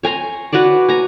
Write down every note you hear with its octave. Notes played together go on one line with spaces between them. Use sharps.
C#5 G#5 A#5 C6
F#4 B4 C#5 D5
G#5 A#5